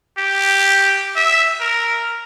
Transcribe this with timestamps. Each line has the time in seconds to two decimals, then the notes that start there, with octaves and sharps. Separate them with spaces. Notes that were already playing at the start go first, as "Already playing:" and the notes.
0.18 G4
1.16 E5
1.60 A#4